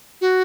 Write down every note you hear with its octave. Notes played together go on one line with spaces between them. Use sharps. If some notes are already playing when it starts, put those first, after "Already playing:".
F#4